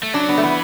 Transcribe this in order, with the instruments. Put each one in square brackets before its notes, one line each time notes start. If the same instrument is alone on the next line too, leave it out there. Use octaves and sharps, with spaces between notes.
[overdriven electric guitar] A3
[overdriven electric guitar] F#3 [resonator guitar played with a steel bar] D4
[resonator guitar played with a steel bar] B3
A3
[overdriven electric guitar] E3 [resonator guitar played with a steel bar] B3